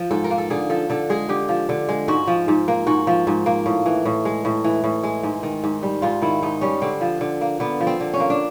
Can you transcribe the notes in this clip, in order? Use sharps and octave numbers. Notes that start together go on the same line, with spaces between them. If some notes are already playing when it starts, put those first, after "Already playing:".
Already playing: F3
G#2 A4
A#4
A#3
A4
D3 G#4
F3 A4
D3 A4
G#3 G#4
D3 G4
F3
D3
G#3
G#2 F#4
F3
G#2
A#3
G#2 F#4
F3
G#2
A#3
A2
E3
A2
G#3
A2
E3
A2
G#3
G#2
D#3
G#2
G3
G#2 F4
D#3 E4
G#2 D#4
G3 C#4
D3 C4
F3
D3
A#3
D3 B3
F3
C4
D3
C#4
A#3
D4